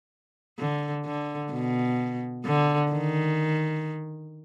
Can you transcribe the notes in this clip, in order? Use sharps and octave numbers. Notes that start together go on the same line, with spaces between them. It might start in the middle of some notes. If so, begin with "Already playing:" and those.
D3
D3
B2
D3
D#3